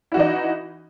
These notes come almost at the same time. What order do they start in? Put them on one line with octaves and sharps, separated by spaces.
E4 F#4 E3 D#4